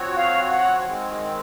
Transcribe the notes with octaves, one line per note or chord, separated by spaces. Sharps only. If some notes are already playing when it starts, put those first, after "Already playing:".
Already playing: F3 C4 F#4 C#5
F5
F#5
D#3 G#3 C4